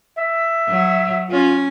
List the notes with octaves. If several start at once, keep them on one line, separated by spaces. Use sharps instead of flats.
E5
F#3
C#4 F4